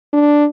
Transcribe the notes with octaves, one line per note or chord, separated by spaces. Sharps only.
D4